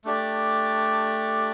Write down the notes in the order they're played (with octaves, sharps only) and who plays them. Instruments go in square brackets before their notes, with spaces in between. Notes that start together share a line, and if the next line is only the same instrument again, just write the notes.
[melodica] A3 D4 G4 D5